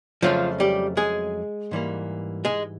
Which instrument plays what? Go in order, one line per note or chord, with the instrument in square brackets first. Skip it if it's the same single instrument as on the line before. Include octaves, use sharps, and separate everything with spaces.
[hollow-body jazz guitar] F2 C#3 F3 F#3 A3 F4
G3 G4
G#3 G#4
G#2 E3 G3 A#3
G#3 G#4